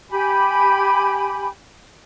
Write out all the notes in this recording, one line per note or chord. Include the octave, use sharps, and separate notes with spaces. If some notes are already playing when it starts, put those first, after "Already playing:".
G4 G#5 B5